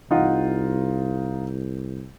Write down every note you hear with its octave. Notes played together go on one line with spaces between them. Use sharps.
C2 D#4 F4 F#5